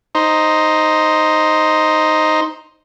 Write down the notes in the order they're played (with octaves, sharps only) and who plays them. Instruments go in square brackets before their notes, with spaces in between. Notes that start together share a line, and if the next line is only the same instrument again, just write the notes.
[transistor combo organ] D#4 C5